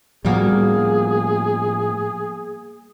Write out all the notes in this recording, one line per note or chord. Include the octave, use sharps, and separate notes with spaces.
A2 F3 G3 A#3 B3 F#4 G#4